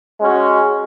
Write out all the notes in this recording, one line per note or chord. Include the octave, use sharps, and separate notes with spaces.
G#3 C#4 F#4